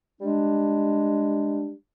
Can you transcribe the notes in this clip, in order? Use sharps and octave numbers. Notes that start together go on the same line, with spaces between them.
G3 G#3 D4